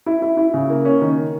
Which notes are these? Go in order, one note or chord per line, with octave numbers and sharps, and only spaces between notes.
E4
E4
E4
C#3
A#3
C#4
D#3